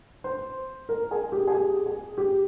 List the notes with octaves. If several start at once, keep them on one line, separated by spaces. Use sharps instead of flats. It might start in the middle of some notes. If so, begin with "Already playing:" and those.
C5
A#4
G#4
G4
G#4
G4
G#4
G4